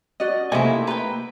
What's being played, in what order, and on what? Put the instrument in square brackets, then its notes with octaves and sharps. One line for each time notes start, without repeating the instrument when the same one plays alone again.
[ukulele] C#4 F#4 D5 [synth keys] D#5
[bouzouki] C3 E4 [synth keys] A3 [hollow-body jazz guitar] A#3 D#5 G#5 [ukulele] C#4 D#4
[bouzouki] B4 G5 [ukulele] A#5